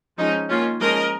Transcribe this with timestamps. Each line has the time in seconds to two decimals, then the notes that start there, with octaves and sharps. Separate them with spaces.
0.18 F3 G#3 C#4 D#4
0.50 D#3 A#3 C#4 F4
0.81 F3 G#3 C#4 A#4 D#5